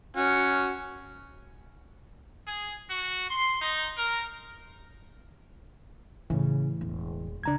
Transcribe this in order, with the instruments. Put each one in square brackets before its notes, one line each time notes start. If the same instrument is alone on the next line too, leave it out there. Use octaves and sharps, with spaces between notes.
[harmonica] C#4 F#4
[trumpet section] G#4
F#4
C6
D#4
A#4
[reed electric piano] A2 E3 [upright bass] C#3
[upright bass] E1
[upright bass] C#2 C#3 [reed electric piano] D4 A#5 G#6